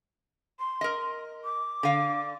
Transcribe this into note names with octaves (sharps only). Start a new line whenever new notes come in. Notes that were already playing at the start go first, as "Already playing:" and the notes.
C6
A#4 D#5
D6
D3 F5